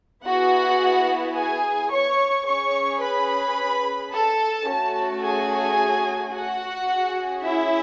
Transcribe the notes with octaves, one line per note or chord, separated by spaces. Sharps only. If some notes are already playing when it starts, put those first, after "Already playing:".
B3 E4 F#4 G#4 F#5
G#4 G#5
C#5 C#6
C#4 G#4 C#5 C#6
B4 B5
A4 A5
A3 C#4 F#4 A4
G#4 G#5
F#4 F#5
C#4 G#4
E4 E5